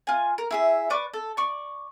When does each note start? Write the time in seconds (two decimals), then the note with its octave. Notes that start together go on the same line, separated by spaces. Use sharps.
0.07 F4 G#5
0.38 A#4
0.51 E4 G#4 E5
0.90 B4 D5 C#6 D6
1.14 A4
1.37 D5 C#6